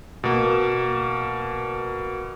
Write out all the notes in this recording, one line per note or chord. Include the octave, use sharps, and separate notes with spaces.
B2 A#3